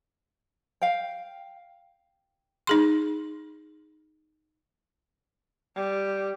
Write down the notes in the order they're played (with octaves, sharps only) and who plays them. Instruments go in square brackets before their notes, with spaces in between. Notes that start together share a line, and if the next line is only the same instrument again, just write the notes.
[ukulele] F5 G5
[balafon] D#4 G#4 C6
[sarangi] G3